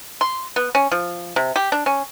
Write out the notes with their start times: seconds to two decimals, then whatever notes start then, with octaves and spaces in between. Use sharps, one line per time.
0.21 C6
0.56 B3
0.75 C#4
0.92 F3
1.36 C3
1.56 G4
1.72 D4
1.86 C#4